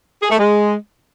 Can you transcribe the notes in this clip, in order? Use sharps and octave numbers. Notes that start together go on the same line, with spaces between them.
G#4
A3
G#3